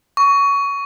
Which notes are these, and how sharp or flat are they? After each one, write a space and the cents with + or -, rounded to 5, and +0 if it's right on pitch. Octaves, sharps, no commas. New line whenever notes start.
C#6 +20